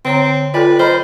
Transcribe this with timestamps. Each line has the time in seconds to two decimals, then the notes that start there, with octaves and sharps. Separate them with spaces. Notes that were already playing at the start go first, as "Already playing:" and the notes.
0.05 D3 C4 C#5 A#5
0.54 F4 A4 B4 D5 G5
0.80 A#4 C5 D#5 B5